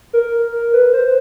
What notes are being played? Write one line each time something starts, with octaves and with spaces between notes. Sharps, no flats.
A#4
B4
C5